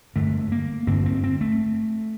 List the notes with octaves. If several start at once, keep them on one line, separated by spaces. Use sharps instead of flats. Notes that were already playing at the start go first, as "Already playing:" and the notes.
G2 D3 A3
A#3
G2 D3 C4
C4
C4
A3